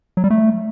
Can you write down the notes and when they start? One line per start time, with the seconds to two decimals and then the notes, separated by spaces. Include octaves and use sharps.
0.17 F#3
0.24 G3
0.30 A3